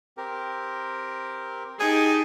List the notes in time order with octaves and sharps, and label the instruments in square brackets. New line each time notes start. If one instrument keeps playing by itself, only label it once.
[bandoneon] C4 G4 A#4
[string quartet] D#4 G4 A5 [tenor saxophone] G#4